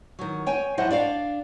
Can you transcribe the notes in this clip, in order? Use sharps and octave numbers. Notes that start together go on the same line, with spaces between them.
D#3 F#3
C#5 G5 G#5
F3 F#3 E4 C5 D#5 F#5
D4 D5 F5